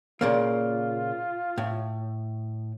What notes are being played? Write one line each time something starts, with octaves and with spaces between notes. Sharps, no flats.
A#2 C#3 A#3 F4
A2